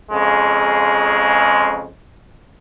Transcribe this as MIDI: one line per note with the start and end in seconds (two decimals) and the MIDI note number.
0.11 1.88 41
0.11 1.88 49
0.11 1.88 56